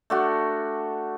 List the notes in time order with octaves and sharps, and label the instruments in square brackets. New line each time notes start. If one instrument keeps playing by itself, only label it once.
[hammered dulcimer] A3 D4 F#4